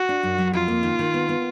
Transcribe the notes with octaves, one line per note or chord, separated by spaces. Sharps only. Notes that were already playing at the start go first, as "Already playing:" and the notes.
Already playing: F#4
D4
F#2
F#3
F2 F4
A#3
D#3
D#3
B3
B3